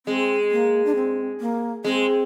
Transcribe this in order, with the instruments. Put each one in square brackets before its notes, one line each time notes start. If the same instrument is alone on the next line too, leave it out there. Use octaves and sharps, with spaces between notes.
[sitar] G#3 [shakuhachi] C4
[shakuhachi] A#3
D4
C4
A#3
[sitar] G#3 [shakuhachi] C4